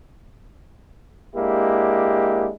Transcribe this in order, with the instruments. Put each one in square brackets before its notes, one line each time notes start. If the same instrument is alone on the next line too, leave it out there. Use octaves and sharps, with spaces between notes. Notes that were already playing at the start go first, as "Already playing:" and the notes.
[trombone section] G#3 A#3 D4 E4 G4